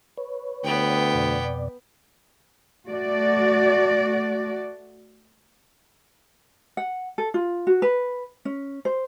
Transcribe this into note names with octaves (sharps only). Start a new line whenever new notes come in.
B4 C#5
D2 B3 G5
F2 B2 D5
A3 F#4 D5
F#5
A4
F4
F#4
B4
C#4
C5